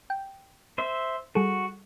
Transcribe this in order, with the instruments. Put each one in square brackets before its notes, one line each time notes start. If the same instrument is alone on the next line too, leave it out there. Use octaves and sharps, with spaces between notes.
[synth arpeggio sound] G5
[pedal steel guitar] C5 E5
[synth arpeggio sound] G3 G#4 A4 [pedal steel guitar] F#4